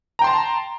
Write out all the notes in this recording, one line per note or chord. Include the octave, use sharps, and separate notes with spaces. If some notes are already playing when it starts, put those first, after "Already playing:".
G5 A5 A#5 C6